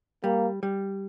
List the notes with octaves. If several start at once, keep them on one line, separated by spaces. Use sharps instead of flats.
G3 A#3
G3